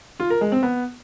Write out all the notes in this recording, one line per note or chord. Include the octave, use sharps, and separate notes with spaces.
F4
A#4
G#3
C4
B3